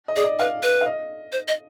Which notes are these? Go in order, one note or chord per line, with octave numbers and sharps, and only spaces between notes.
D#5
G#4 D5
D#5
B4 F5
B4
F5
D#5
C5
D#5